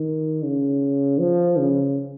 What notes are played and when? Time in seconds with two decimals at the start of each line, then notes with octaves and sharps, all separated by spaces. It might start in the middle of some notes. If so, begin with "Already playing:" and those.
Already playing: D#3
0.43 C#3
1.20 F3
1.58 C#3